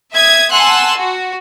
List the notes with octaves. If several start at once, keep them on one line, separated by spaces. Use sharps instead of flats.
E5 D#6 G#6
F#5 G#5 A5 C6 E6 F#6
F#4